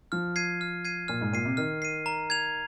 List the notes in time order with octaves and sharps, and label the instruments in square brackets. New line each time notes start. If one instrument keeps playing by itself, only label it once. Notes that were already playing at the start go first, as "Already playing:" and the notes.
[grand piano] F3 [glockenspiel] F6
[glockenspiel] G#6 C7 D#7
F6
G#6 C7 D#7
[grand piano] A#2 [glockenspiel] F6
[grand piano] G#2
[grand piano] A#2 [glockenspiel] C7 D#7
[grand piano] C3
[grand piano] D#3 [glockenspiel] F6
[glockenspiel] C7 D#7
A#5
G#6 F7